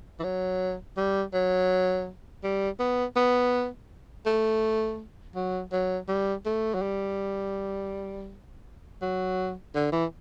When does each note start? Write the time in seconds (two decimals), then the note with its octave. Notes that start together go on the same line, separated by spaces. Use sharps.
0.20 E3
0.24 F#3
0.97 G3
1.34 F#3
2.44 G3
2.80 B3
3.16 B3
4.26 A3
5.35 F#3
5.72 F#3
6.08 G3
6.46 A3
6.75 F#3
6.82 G3
9.02 F#3
9.75 D3
9.92 E3